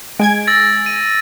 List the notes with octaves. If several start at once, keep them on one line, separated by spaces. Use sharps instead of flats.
G#3 G#5 G#6 D7
E6 A6 A#6
D#7